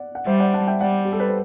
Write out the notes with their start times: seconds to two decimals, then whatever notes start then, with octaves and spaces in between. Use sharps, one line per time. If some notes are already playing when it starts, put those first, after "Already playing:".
Already playing: D5 F#5
0.15 F#5
0.26 G3 C5 E5
0.40 D5 F#5
0.54 F#5 A5
0.67 E5 G5
0.81 G3 D5 F#5
1.05 G4
1.12 A4
1.20 B4
1.28 C5